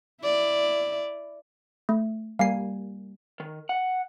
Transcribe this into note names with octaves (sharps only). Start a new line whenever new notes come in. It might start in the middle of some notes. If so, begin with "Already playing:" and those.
E4 D5
A3
G3 A#3 F5 G#5 C7
D#3
F#5